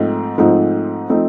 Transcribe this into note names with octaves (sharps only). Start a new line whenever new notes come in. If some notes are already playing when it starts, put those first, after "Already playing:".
Already playing: G#2 F3 A3 C4 D#4
G#2 F3 A3 C4 D#4
F3 A3 C4 D#4